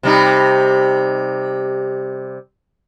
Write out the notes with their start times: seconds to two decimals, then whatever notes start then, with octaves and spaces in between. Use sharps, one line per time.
0.03 C3 G3 D#4